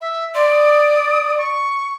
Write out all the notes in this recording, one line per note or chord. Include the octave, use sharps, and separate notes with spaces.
E5
D5 C6
D#6
C#6